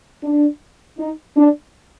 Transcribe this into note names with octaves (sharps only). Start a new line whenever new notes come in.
D4
D#4
D4